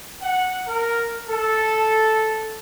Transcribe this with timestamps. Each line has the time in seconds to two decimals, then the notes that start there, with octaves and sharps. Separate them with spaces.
0.23 F#5
0.67 A#4
1.29 A4